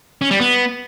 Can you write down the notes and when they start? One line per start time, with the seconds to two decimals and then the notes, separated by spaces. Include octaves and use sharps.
0.22 C#4
0.31 G3
0.40 B3